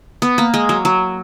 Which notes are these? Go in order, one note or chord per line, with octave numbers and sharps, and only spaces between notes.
B3
A#3
G#3
F#3
F#3